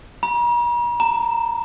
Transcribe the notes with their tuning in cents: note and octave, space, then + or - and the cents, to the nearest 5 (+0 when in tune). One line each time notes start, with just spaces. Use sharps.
A#5 +45
A#5 -20